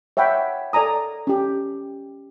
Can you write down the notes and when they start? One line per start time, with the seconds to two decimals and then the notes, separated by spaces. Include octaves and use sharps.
0.17 C#5 E5 F#5 G5 B5
0.73 A4 D5 G#5 A#5 D#6
1.27 C#4 G4